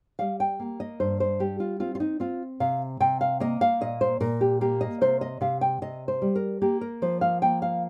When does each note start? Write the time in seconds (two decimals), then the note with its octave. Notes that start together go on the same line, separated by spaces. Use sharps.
0.19 G3 F5
0.40 G5
0.60 A#3
0.80 D#5
1.00 G2 C5
1.20 C5
1.39 G3 G4
1.60 F4
1.80 C4 F4
1.95 F4
2.00 D#4
2.20 C4 F4
2.60 C3 F5
3.00 C3 G5
3.21 F5
3.40 A#3 D#5
3.61 F5
3.81 A#2 D#5
4.01 C5
4.20 A#2 A#4
4.41 G4
4.61 A#3 G4
4.81 D#5
5.01 C3 C5
5.21 D#5
5.41 C3 F5
5.61 G5
5.82 C3 D#5
6.08 C5
6.22 G3
6.36 A#4
6.62 A#3 G4
6.81 A#4
7.02 F3 C5
7.21 F5
7.42 A#3 G5
7.62 F5